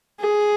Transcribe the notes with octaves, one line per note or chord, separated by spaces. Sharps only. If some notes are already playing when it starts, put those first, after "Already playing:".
G#4